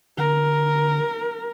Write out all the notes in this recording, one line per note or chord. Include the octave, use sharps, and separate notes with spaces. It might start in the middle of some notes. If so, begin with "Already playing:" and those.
D3 A#4